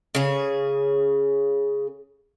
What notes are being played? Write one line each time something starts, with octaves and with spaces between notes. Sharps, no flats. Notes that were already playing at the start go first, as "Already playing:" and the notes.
C#3 G#4